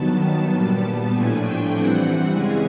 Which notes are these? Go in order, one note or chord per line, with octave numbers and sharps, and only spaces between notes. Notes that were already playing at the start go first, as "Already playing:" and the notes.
Already playing: G2 D#3 F#3 B3 A5
A5
A#2 G3 B3
A2 F3 A3 D4 G#5
G5
G2 E3 G3 C4 F#5
C#3 E3 G#3 C#4 G#5